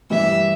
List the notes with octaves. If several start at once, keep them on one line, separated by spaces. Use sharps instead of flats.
G2 E3 G3 E5